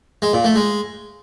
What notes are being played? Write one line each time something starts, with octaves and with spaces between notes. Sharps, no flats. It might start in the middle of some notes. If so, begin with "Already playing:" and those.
G#3
A#2
A3
G#3